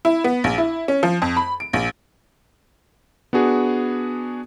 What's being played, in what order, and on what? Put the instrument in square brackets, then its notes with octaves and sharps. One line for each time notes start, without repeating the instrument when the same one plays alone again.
[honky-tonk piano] E4
B3
A#1
E4
C#4
F3
F2
B5
D7
A#1
[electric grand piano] B3 D4 F#4 G#4